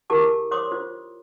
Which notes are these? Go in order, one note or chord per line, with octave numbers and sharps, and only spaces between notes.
E4 G4 G#4 A#4 A5 D6
C5 C#5 C6 D6 D#6
F4 C5